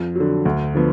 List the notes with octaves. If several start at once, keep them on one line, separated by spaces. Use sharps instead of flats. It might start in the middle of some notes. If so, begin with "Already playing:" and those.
Already playing: F2
D3 F#3
D2
D3 F3 B3